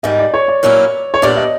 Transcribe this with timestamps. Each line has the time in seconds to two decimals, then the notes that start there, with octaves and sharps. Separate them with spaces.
0.03 G#2 D#3 G3 D#5
0.19 D5
0.34 C#5
0.48 D5
0.63 A#2 F#3 A#3 C#4 E4
1.14 C#5
1.22 A#2 G3 B3 D4 D5
1.37 D#5